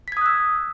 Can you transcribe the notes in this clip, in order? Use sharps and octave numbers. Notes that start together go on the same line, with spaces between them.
D#6 E6 F#6 G#6 B6